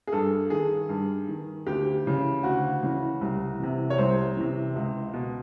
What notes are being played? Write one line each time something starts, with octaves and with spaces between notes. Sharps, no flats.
G#4
G2 A4
D#3 G#4
G2
D#3
D2 G4
C#3 E3
D2 F#4
C#3 E3
C2
C3 E3
C#5
C2 C5
C3 E3
C#2
B2